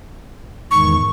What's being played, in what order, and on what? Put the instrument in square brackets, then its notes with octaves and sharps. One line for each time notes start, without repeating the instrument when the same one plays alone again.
[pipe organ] E2 G#2 D#3 [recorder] C#6